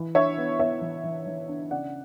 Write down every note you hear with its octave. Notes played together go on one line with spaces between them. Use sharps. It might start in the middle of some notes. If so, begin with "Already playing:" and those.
Already playing: E3
D4 C#5 E5
B3
B3 C#5 E5
E3
E3
E3
D4
C#3 D5 F#5